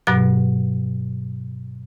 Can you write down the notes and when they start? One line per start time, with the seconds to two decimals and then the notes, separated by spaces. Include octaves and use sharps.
0.07 G2 B2 F#3 F#6